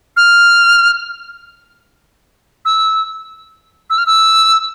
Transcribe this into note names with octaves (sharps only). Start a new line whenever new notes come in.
F6
E6
E6
F6
E6